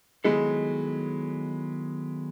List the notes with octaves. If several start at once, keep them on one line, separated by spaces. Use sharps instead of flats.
D#3 F#3 G#3 B3 E4 A4